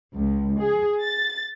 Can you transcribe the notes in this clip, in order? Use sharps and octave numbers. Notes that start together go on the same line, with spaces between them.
C#2
G#4
A6